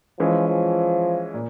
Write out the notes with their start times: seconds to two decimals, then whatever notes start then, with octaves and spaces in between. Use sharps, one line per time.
0.20 E3 F3 G#3 C#4
0.48 F3
1.34 A#2